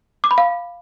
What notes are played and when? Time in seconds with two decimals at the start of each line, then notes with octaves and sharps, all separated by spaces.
0.24 D6
0.31 B5
0.38 F5